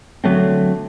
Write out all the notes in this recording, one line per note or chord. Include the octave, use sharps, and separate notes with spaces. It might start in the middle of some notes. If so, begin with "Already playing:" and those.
D3 F#3 A3 C4